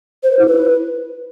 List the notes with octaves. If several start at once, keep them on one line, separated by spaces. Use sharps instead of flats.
C5
B4
E4
B4